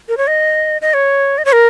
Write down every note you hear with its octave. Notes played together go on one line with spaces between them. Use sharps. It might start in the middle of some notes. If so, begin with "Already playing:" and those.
A#4
C#5
D#5
D#5
C#5
D#5
C#5
A#4